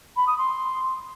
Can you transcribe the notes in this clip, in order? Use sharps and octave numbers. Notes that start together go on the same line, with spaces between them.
B5
D#6
C6